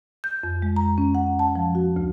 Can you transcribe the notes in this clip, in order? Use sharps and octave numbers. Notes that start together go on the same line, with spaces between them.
G6
F2
G#3
A#5
C#4
F#5
A5
F3
F#4
D2